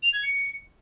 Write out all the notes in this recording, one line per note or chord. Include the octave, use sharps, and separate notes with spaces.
F7
G#6
C#7